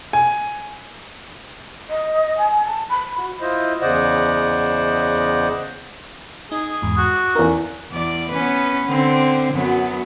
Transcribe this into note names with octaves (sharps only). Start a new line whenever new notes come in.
G#5
D#5
G#5
A5
B5
F#4
E4 F4 C5 D#5
E2 C#3 C5 D5 D#5 F#5
D#4 G#4
E2 G#2
F#4
D6 D#6
E2 D#4 A#4 F5
E2 D5
B3 C#4 B4
D3 C4
F#2 F#3 B3